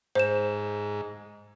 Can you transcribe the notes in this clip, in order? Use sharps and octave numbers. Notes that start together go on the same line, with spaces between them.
G#2 C5 E7